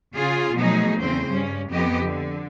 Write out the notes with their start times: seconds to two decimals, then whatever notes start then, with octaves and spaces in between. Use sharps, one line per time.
0.13 C#3 F4 G#4
0.55 B2 F3 F#3 A3 D#4 G#4
0.98 E2 C#3 A3 C4 C5
1.31 G2 G3 C#4
1.70 F2 B3 G4 D#5
2.02 D3